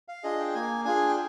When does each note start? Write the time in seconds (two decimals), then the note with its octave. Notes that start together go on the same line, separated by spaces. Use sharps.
0.08 F5
0.24 D4 F4 G#4 D#5
0.39 G5
0.54 A#3 G#5
0.85 D4 F4 G#4 G#5
1.08 G5